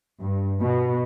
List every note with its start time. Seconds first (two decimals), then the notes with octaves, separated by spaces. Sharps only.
0.21 G2
0.62 B2